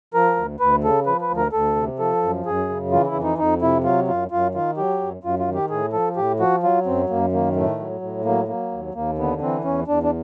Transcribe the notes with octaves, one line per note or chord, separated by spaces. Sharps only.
F3 A#4
D2
D2 B4
C#3 A4
F3 B4
B4
D2
A#4
D2 A4
C3
F3 A4
F#2
F#2 G#4
C#3
E3 F4
E4
F2
D#4
F2 D#4
C3 E4
F#3 F4
F#2 F4
F#2 F4
D#3 F4
F#3 G4
F#2
F#2 F4
F4
D#3
G4
A2 G#4
F3 A4
A2 G4
F3 F#4
F#3 F4
F#2 C4
F#2 A#3
D#3 A#3
A2 A3
F#3
A2
F#3 A#3
F#3 A#3
D#2
D#2 A#3
D3 B3
E3 C4
E2 C#4
E2 D4
D4